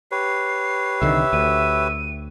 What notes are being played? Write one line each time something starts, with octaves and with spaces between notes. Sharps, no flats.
G4 B4 C#5 C7
C2 D3 D#3 E5
D2 D#7